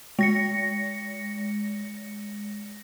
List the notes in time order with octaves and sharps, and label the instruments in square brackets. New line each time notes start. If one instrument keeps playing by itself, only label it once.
[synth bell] G#3 A#6 C#7